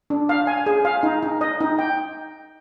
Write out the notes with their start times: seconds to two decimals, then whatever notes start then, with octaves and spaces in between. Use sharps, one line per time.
0.10 D4
0.29 F5
0.47 G#5
0.66 G#4
0.85 F5
1.03 D#4
1.23 D#4
1.41 D#5
1.61 D#4
1.79 G5